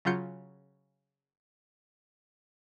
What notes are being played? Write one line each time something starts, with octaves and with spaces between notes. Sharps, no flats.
C#3 F#3 F4 G6 C#7